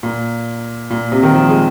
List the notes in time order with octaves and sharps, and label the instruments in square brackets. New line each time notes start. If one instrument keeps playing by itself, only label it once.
[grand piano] A#2
A#2
C3
D#3
F3
G#3